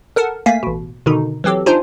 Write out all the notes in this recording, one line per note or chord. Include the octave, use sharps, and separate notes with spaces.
A4 A#4 F#5 A5
A3 A#3 F5 G#5 B6
A1 B2
B2 D3 D#3 D#4
E3 F#3 C4 G4 A4
D4 D#4 F4 C5 G#5